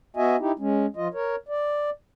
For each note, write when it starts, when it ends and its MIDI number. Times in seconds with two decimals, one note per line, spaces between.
0.16 0.36 59
0.16 0.36 66
0.16 0.36 75
0.16 0.36 76
0.16 0.36 80
0.40 0.52 63
0.40 0.52 64
0.40 0.52 67
0.59 0.86 56
0.59 0.86 61
0.96 1.08 53
0.96 1.08 65
0.96 1.08 75
1.14 1.36 70
1.14 1.36 73
1.48 1.90 74